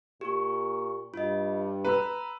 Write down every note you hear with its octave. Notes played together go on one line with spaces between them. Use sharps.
A#2 G4 C#6
G2 F4 D#5
B4 A#5 B5 E6